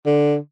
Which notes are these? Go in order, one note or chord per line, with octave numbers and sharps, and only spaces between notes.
D3